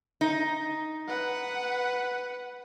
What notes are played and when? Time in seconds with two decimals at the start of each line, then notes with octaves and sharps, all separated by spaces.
0.21 D#4
1.08 B4 F#5